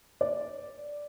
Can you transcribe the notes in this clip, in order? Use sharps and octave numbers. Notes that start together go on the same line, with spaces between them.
D5